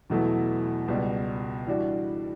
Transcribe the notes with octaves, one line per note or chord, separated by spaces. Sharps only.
E2 B2 F#3 A3 E4
C#2 B2 G3
E3 G3 D4 F#4